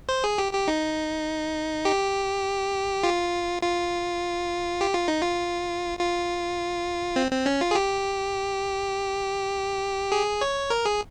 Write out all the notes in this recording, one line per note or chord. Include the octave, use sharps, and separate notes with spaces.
C5
G#4
G4
G4
D#4
G4
F4
F4
G4
F4
D#4
F4
F4
C4
C4
C#4
F4
G#4
G4
G#4
C#5
A#4
G#4